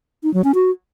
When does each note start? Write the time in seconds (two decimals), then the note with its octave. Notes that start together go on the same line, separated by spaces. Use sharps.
0.23 D#4
0.34 F#3
0.44 C#4
0.55 F#4